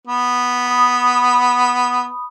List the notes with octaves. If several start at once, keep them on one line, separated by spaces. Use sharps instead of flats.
B3
B5 D#6